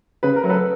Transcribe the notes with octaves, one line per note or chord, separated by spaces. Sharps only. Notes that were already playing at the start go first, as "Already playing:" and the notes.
C#3 B4
A#4
F#3 A3
A4 B4